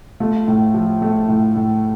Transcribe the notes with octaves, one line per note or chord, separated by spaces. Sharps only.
A3 F4
A2
F3
A3
A2
A2